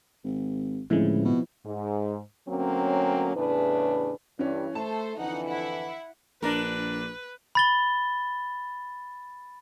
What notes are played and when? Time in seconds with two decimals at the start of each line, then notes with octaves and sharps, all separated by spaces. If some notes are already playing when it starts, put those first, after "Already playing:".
0.24 G#1
0.90 C#2 A2 D3 F3 G#3 C4 E4
1.25 B2
1.65 G#2
2.49 D2 F#3 A#3 C4 C#4
3.35 E2 A2 C#3 D4 B4
4.39 G2 E3 C#4
4.75 A3 A4 C5 A5
5.18 F2 D3 E3 D#4 F#5
5.47 E4 F#5
6.43 A#1 D4 A#4 B4
7.55 B5 A6 G7